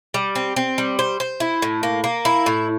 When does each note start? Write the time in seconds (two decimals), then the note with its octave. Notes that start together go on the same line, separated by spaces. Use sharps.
0.14 G3
0.35 C4
0.56 C4
0.78 G3
0.99 C5
1.20 C5
1.40 E4
1.62 A2
1.83 A#3
2.04 A#3
2.25 E4
2.46 A2